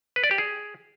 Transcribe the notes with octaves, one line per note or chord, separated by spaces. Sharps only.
B4
D5
G4
G#4